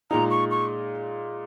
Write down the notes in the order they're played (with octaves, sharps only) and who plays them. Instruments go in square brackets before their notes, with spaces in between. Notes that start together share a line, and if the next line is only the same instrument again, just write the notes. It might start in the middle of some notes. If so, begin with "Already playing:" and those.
[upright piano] A#2 G#3 D#4 [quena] A#5
[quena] C#6
C#6